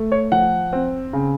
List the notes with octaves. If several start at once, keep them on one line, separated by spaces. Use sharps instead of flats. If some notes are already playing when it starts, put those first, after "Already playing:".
Already playing: A3
C#5
F3 F#5
C4
C#3